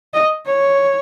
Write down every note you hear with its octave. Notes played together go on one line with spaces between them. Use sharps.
D#5
C#5